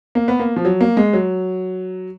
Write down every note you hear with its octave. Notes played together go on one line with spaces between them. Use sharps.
A#3
B3
A#3
F3
F#3
A#3
G#3
F#3